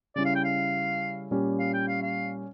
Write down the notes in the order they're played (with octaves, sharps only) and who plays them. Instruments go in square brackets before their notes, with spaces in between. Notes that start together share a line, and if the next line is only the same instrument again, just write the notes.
[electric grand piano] C#3 G3 C#4 E4 [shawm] D5
[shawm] F5
G5
F5
[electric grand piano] A#2 G3 C#4 G4
[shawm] F5
G5
F5
F5